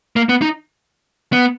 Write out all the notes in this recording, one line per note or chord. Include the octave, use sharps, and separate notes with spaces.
A#3
B3
D#4
B3